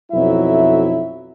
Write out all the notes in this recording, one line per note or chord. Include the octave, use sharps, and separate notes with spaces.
B1 F2 F#3 E4 E5